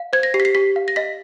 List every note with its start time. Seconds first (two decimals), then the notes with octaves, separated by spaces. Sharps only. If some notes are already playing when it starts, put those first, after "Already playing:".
Already playing: F5
0.13 C5 G#6
0.23 A#6
0.34 G4 C7
0.40 B6
0.45 C7
0.55 G4 B6
0.76 F5
0.88 A#6
0.96 D#5 B6